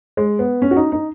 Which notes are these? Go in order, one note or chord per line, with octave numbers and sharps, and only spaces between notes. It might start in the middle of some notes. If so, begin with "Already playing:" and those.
G#3
B3
C#4
F#4
D#4
D#4